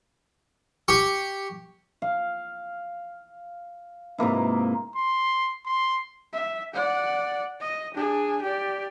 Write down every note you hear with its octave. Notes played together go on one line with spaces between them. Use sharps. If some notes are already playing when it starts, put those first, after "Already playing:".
G4 C#6
F5
G#2 C3 A#3 E4
C6
C6
E5
D5 F#5
D#5
D4 G#4
G4 D5